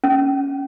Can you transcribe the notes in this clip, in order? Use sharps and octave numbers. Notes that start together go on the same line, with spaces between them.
C#4